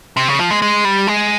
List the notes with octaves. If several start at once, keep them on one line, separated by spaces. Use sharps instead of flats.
C3
C#3
F3
G#3
G#3
G3
G#3